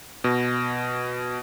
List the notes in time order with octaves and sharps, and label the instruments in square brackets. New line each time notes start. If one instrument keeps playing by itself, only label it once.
[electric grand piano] B2